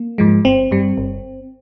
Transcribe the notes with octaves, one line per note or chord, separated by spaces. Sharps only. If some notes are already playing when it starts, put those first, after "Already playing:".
Already playing: A#3
G#2 F3 G#3
G1 C4
G2 G3
G1